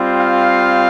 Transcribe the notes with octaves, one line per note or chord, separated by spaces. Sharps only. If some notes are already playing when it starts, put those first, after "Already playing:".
Already playing: G3 C4 F4
F5